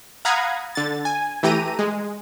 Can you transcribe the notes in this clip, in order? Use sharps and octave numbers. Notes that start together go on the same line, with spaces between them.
F5 F#5 A#5 B5 D#6 G#6
D3 A6
G#5
E3 A3 G4 A#5 D#7
G#3